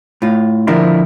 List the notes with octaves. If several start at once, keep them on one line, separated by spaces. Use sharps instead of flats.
A2 F4
A#2 D3 F3 A#3 D4 E4